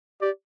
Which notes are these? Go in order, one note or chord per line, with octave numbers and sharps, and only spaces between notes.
G4 D5